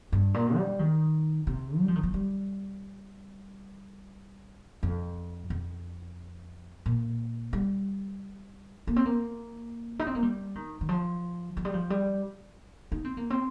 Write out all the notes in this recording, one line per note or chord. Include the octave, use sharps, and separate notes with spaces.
G2
A#2
G3
D#3
C3
G3
F3
D#3
F3
G3
F2
F2
A#2
G3
A#3
C4
A#3
D#4
C4
A#3
G3
D#3
D#3
F3
F3
G3
F3
G3
D#4
C4
A#3
C4